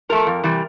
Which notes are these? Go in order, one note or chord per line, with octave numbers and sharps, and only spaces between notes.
F3 A3 A#4
F2
C3 E3 G3